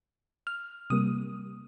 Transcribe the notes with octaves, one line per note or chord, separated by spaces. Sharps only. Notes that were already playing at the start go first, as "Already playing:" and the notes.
F6
C3 G3 A#3 D#6